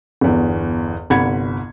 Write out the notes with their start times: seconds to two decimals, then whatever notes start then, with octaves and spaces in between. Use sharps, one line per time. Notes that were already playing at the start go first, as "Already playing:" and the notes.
0.21 G1 E2
1.10 G1 C2 F#5 B5 G#6 C#7